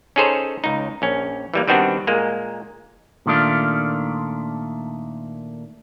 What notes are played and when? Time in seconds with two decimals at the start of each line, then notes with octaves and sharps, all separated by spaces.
0.16 C#4 D#4 G#4 A4 C5 C#5
0.64 C#2 D#4
1.02 A#1 C#4
1.54 E3 G3 A#3
1.68 D#3 G3 B3 C4 D4 F#4
2.07 A#2 G#3 A#3
3.26 A#2 D#3 A3 D4 F4